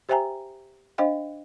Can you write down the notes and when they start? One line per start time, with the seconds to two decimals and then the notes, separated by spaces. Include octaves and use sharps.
0.09 G4 C5 E5 G5 G#5 A#5
0.98 D4 C5 D#5 F5 G5